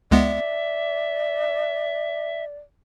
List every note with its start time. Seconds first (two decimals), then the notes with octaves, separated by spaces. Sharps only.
0.11 C#2 G#3 B3 D5 E5